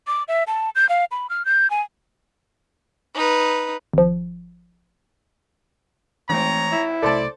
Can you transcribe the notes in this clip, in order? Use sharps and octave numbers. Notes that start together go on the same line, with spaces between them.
D6
E5
A5
G6
F5
B5
F6
G6
G#5
D#4 B4
G#1 F3
G#1 E3 A3 C4 C#5 A#5
E4
B1 C3 A3 A4 C5 D5 A5